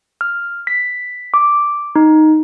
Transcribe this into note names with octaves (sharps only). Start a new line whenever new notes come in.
F6
B6
D6
D#4